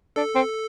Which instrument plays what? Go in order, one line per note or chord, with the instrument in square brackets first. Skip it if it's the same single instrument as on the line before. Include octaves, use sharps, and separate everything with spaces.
[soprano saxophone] D4 [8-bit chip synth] A4
[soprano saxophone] C4